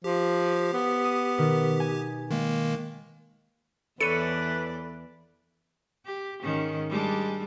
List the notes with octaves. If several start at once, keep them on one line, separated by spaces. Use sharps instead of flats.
F3 G4
B3
D#6
B2 D#3
G#5
D#3 G#3 A#3
E2 E3 A4 B4 C#5 D5 C#7 D#7
G4
G#2 D#3 C#4
G3 G#3 D4